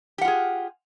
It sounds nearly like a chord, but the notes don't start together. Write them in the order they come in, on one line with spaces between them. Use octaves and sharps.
G4 F#5 F4 G#4